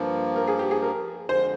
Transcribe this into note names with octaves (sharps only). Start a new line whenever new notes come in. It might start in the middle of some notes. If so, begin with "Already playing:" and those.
Already playing: G2 F3 A#3
A#4
G#4
G4
G#4
A#4
F2 D3 G#3 C5